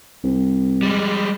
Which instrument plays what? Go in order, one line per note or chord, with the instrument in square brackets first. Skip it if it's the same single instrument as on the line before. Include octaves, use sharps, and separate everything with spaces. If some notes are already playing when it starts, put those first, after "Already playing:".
[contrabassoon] C2
[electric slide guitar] G3 G#3